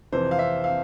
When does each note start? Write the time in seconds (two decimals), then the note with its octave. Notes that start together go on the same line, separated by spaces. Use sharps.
0.12 F2 C3 E3 C5
0.31 F5
0.39 E5
0.64 F5